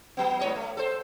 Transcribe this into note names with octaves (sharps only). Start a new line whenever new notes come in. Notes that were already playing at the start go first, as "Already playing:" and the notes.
F#3 B3
G#2 C#5 D#5
A3
A4 C5